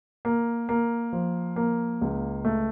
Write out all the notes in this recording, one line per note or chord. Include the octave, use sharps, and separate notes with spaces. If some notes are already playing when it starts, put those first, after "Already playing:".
A#3
A#3
F3
A#3
C#2
A3